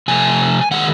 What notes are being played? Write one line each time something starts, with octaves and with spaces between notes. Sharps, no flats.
C3 F3 A3 G#5
D#3 G#3 F#5